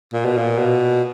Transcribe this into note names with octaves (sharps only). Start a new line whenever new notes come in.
A#2
B2
A#2
B2